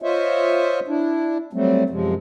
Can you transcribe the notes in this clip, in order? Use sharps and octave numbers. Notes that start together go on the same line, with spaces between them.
F4 C5 C#5 D#5 E5
D4 E4
F#3 G3 A3 C4
F#2 C3 F3 G#3